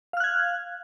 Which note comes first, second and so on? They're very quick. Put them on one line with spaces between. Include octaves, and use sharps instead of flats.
F5 F6 F#6 G#6